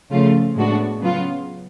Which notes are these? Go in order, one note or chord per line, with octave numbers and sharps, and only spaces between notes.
C#3 F3 A3 F4
A2 G#3 B3 D4 F#4
C#3 F#3 B3 F4